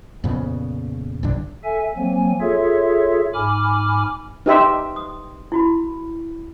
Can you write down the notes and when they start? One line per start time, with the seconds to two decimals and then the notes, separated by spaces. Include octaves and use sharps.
0.24 F2 A#2 C#3 B3
1.23 B1 G2 D3 D4
1.64 A4 E5 G#5
1.97 F3 F#3 A#3 C4 G#5
2.41 F4 G#4 A4 C#5 E5
3.34 G#2 G#5 B5 D6 F6
4.46 D#4 G4 B4 E5 C6
4.96 D#6
5.52 E4 F#4 B5